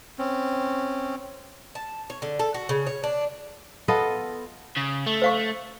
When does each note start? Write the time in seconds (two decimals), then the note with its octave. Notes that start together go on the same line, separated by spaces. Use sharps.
0.18 C4 C#4
1.75 A5
2.10 C#5
2.22 D3
2.39 A4
2.54 F#4
2.69 C#3
2.87 C#5
3.04 D4
3.88 B3 F4 A4 D#5
4.77 C#3
5.06 A3
5.22 C5 F5 C#6